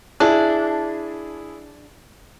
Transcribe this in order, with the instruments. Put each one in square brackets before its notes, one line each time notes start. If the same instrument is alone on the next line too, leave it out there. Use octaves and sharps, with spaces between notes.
[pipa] D4 [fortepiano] E4 G#4